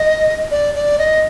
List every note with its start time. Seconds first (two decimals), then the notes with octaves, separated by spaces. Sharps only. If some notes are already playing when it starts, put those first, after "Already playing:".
Already playing: D#5
0.51 D5
0.75 D5
0.99 D#5